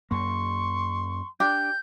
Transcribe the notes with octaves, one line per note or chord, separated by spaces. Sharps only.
F#2 A#3 C6 C#6
D4 G4 G6